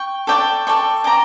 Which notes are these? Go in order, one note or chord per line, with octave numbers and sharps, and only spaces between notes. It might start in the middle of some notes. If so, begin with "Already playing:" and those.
Already playing: G5 C#6
A4 D5 G5 C#6
A4 D5 G5 C#6
D5 G5 A#5 D6